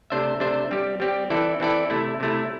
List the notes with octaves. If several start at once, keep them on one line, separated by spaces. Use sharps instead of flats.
C3 A3 D4 C5 E5
C3 A3 D4 C5 E5
G3 C4 G4
G3 C4 G4
E3 C4 E4 A4 D5
E3 C4 E4 A4 D5
C3 A3 E4
C3 A3 E4